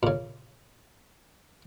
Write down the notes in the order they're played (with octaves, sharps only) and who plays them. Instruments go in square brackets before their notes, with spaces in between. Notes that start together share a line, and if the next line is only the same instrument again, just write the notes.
[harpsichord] A#2 C#3